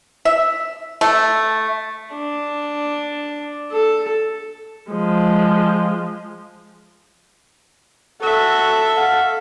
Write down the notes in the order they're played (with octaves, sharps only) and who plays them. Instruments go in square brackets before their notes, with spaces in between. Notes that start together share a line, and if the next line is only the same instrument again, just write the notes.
[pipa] E5
A3
[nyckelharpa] D4
A4
[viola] F3 G#3
[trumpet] F#4 [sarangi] A4 [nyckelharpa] E5
[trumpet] F5 [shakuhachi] F#5